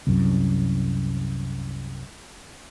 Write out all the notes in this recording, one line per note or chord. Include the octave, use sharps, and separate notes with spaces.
C2 F#2